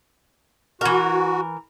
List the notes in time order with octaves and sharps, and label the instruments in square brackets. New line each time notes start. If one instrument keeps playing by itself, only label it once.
[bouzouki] E3 A#4 [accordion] F#4